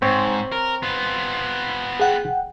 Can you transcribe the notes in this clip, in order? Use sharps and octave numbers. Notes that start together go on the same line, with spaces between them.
G#2 C4 C#5
A#4
B3 F4
G#4 F#5 G5